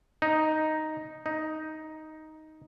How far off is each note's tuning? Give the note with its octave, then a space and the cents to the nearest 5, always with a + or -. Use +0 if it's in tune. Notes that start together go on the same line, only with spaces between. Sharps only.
D#4 +0
D#4 +5